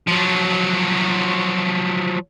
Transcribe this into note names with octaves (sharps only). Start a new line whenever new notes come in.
F3 F#3